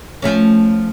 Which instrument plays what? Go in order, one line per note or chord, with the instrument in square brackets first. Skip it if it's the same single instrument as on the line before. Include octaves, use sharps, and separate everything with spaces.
[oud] F3 A3 C#4